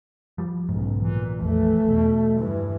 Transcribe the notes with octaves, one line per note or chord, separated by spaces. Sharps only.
F3 G3
B1 G#2 C#3
A#2 E3
A#1 F2 A3
E2 B2
G2 E3